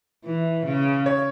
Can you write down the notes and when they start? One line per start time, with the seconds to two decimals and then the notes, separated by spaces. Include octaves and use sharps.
0.24 E3
0.66 C#3
1.06 C#5